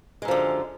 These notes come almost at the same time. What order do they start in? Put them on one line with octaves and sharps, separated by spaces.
G#3 F#2 F3 D3